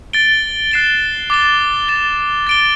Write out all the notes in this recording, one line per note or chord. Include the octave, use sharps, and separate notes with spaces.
A6 D7 G7
F#6 C7 E7 G7
D6 A6 E7 G7
A6 E7 G7
A6 D7 G7